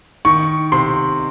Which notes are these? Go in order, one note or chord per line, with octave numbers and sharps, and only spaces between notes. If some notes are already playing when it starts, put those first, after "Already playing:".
D#3 C#6
C3 C6